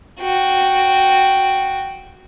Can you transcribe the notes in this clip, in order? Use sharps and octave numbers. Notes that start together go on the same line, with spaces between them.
F#4 G5